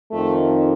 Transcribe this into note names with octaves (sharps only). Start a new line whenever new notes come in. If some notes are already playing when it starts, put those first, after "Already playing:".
F2 D#3 A3